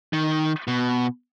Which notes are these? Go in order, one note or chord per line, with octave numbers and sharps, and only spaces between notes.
D#3
B2